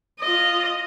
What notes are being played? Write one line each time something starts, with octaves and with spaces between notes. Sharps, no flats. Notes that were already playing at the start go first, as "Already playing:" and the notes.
F4 D#5